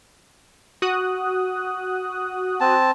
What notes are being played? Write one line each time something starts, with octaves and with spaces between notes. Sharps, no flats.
F#4 D#6 F#6
C4 A5